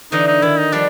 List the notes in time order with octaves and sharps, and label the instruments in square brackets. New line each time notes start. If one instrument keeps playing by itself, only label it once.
[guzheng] D3 E3 [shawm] D#4
[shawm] D#4
[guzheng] D#3 [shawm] E4
[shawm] D#4
[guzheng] F3 G3 [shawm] D4